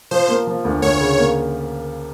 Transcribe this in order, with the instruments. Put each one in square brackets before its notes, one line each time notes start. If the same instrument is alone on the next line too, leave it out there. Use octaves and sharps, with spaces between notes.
[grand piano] F3 [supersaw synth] C5
[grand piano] A#3
F3
D2
[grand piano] D2 [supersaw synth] C#5
[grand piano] C#3
A#3